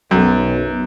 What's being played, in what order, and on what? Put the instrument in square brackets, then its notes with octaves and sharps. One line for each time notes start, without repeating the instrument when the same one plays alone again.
[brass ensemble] B1 [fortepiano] F#2